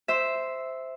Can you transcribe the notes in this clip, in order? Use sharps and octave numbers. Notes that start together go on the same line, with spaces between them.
C5 E5